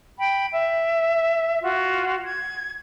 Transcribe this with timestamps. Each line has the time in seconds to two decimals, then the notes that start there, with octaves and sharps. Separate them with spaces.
0.18 G5 B5
0.51 E5
1.61 F4 F#4
2.24 G#6